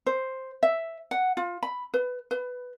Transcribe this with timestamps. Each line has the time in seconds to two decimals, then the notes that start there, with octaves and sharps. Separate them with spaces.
0.06 C5
0.63 E5
1.11 F#5
1.37 F4
1.63 B5
1.94 B4
2.31 B4